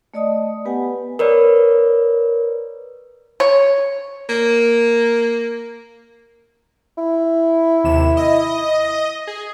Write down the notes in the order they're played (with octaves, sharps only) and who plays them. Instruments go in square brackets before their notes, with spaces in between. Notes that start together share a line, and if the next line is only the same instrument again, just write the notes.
[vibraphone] A3 D5 D#5 A5 D#6
B3 G4 B4 F#5 G#5
[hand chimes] A#4 B4 C#5 D5
[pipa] C#5
[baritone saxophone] A#3
[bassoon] E4
[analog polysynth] D#2 C3 E7
D#5
G#4